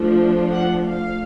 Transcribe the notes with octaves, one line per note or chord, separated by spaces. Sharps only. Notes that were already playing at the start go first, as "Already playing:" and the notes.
Already playing: F3 A3 D4
F#5
F5